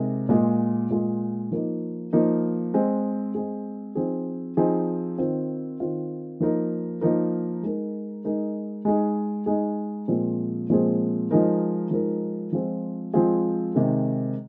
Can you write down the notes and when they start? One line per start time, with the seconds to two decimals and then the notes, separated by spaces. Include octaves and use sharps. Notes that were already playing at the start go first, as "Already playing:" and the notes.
Already playing: C3 G#3 D#4 A#4
0.29 A#2 G#3 F4 G#4
0.90 A#2 G#3 F4 G#4
1.52 F3 A#3 D#4
2.13 F3 A#3 D#4
2.74 G#3 C4 G#4
3.35 G#3 C4 G#4
3.95 F3 C4 D#4 G#4
4.57 F3 C4 D#4 G#4
5.18 D#3 C4 F4
5.80 D#3 C4 F4
6.40 F3 A#3 D#4 A#4
7.01 F3 A#3 D#4 A#4
7.63 G#3 D#4 A#4
8.25 G#3 D#4 A#4
8.85 G#3 D#4 G#4
9.46 G#3 D#4 G#4
10.08 A#2 F3 G#3 C4 G#4
10.70 A#2 F3 G#3 C4 G#4
11.31 F3 G#3 D#4 A#4
11.91 F3 G#3 D#4 A#4
12.53 F3 G#3 C4 F4 G#4
13.14 F3 G#3 C4 F4 G#4
13.75 C3 D#3 G#3